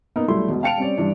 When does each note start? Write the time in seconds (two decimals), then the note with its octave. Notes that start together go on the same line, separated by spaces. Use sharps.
0.16 A#3 B3 D#4 A#4
0.28 B1 G3 A3 E4 C6
0.48 E1 B2
0.63 F5 G5 A5 C#7 D7 F7
0.78 G3 C4 C#4 D5
0.98 G2 E3 D4